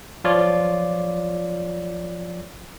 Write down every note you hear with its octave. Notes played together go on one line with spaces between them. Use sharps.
F3 F4 C#5 D5